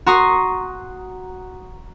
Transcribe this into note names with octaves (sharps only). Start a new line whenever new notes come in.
F#4 A#5 C6 C#6 D#6